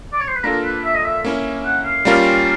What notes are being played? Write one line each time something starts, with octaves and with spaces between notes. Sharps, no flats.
D5
C#5
C5
B4
A#3 D4 F4 A4 A#4
B4
E5
D#5
E5
A#3 C#4 E4
F#5
F5
G3 A#3 C#4 F4 A#4